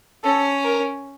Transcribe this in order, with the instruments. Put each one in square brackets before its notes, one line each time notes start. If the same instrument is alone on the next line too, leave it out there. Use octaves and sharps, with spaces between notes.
[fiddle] C#4 [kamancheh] A4
[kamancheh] A#4